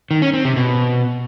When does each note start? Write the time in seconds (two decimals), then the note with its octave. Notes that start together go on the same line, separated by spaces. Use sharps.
0.11 D#3
0.22 C#4
0.34 C4
0.45 C3
0.56 B2